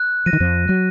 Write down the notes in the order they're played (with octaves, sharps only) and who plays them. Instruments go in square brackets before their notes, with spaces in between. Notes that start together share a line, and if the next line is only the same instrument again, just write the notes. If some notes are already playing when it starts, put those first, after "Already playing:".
Already playing: [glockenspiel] F#6
[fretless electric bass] F3 [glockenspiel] A#6 D#7
[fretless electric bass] D#3
F2 F3
[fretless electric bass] F#3 [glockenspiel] F#6